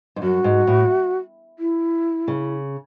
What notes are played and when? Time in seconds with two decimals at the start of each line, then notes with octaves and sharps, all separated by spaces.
0.16 G#2
0.22 F#2 F#4
0.44 G#2
0.67 A2
1.59 E4
2.28 C#3